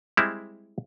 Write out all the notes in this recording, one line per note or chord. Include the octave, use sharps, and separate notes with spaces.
G3 G#3 C4 E4